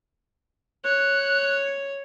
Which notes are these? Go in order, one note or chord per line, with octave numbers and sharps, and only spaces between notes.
C#5 F#6